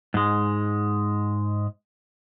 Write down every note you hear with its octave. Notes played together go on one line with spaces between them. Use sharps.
G#2 G#3